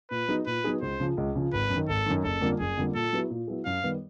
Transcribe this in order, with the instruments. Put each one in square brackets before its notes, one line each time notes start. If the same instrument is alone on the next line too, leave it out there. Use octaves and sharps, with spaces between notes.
[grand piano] A#2 [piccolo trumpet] B4
[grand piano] F#3 B3 D#4 G#4
[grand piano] A#2 [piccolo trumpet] B4
[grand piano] F#3 B3 D#4 G#4
[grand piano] C#2 [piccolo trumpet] C5
[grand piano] C#3 F3
C#2
C#3 F3
[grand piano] G#1 [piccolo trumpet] B4
[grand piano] F#2
D#3
[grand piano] G#1 [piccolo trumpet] A4
[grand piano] F#2 D#3
[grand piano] F#1 [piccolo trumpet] A4
[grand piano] F2 D3 G3 A#3
[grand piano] F#1 [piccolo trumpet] G#4
[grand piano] F2 D3 G3 A#3
[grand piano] A#2 [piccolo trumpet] A4
[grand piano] F#3 B3 E4 G#4
A#2
F#3 B3 E4 G#4
[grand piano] F#2 [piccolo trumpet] F5
[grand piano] D#3 G3 B3